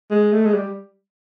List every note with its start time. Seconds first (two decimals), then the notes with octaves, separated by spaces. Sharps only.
0.11 G#3
0.32 A3
0.45 G#3
0.54 G3